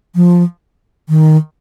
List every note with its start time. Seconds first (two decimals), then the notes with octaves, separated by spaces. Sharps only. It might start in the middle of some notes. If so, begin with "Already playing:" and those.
0.15 F3
1.09 D#3